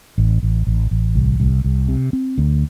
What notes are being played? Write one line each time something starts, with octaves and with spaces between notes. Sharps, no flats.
A1
A1
A1
A1
C2
C2
C2
C3
C4
D2